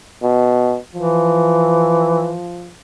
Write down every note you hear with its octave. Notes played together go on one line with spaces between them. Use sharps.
B2
E3 F3